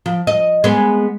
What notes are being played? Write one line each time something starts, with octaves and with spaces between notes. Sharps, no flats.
F3
D#5
G#3 B3